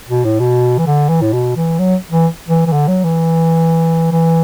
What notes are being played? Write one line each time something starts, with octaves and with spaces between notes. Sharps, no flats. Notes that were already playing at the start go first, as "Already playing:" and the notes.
B2
A2
B2
E3
D3
E3
A2
B2
E3
F#3
E3
E3
E3
D3
F#3
E3
E3